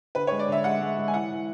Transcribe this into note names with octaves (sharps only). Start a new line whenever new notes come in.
D3 B4
C#5
G#3
D5
D3 E5
G#3 F#5
G#3
G#3
G#5
E3 F#5
E3